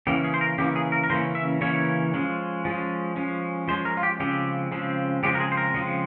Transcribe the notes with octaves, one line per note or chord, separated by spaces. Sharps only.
C#3 E3 A#3 C#4 G4
G#4
C5
A#4
C#3 E3 A#3 C#4 G4
G#4
A#4
A#4
C#3 E3 A#3 C#4 C5
E5
C#3 E3 A#3 C#4 C#5
F3 G#3 C#4
F3 G#3 C#4
F3 G#3 C#4
F3 G#3 C#4 C5
A#4
F4
G4
C#3 F3 G#3 C4 G4
C#3 F3 G#3 C4
C#3 F3 G#3 C4 G4
A#4
G#4
C5
A#4
C#3 F3 G#3 C4